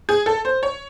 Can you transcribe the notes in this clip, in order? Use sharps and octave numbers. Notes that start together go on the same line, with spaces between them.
G#4
A4
C5
C#5